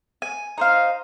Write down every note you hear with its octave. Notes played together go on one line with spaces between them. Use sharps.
G#5
D#4 C5 F5